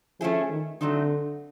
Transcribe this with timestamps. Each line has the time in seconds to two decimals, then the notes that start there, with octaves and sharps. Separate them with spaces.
0.20 F3 A3 C#4 E4 G#4
0.50 D#3
0.81 D3 F#3 A3 C4 D#4